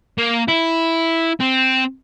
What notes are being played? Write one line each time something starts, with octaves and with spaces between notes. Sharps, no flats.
A#3
E4
C4